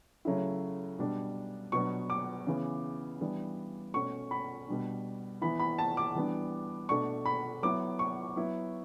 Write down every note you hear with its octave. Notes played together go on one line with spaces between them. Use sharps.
C#3 F#3 A3 E4
B2 G3 D4
B2 F#3 B3 D4 C#6
D6
C#3 E3 B3
E3 G3 B3 D4
B2 A3 C#4 C#6
B5
B2 G3 D4
E3 B3 E4 B5
B5
A5
D6
E3 G3 B3 D4
B2 A3 D4 C#6
B5
F#3 B3 E4 D6
C#6
F#3 B3 E4